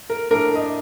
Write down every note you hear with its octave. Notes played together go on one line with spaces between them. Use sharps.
A#4
A2 A3 D4 A#4
D#5
D5